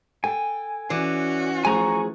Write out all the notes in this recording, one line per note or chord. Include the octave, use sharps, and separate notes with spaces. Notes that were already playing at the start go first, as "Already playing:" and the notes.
A4 G5 G#5
E3 C#4 F#4 D5
F3 A3 G#4 G#5 A#5 C#6